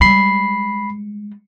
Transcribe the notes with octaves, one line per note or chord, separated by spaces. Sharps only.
G3 G#3 B5 C7